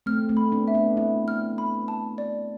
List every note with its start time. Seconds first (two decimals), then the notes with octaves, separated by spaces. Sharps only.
0.06 A3 C4 F6
0.29 A3 C4
0.37 B5
0.52 B3 D4
0.68 E5
0.74 B3 D4
0.97 C4 E4 E5
1.28 F6
1.58 B5
1.88 A5
2.18 D5